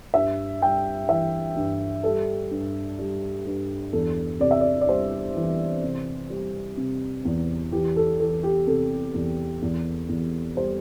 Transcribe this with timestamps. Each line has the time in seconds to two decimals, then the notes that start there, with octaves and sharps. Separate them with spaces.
0.14 G2 E5
0.62 G3 G5
1.09 E3 E5
1.56 G2
2.03 G3 A4
2.51 G2
2.99 G3
3.46 G2
3.93 E2 A4
4.40 C3 D5
4.51 E5
4.61 D5
4.81 D5
4.88 G3 C5
5.35 E3
5.83 C3
6.30 G3
6.77 C3
7.25 E2
7.72 E3 G4
7.96 A4
8.20 E3 A4
8.43 G4
8.67 C3 A4
9.14 E2
9.62 E2
10.09 E2
10.56 G3 C5